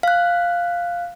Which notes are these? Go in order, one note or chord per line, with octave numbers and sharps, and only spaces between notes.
F5 F#6